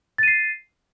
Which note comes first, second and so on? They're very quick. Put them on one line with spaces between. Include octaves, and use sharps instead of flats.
A6 D#7 C7